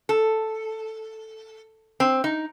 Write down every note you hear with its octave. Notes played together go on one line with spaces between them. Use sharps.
A4
C4
D#4